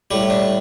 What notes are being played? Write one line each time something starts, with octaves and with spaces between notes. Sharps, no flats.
A2 G3 G4
D4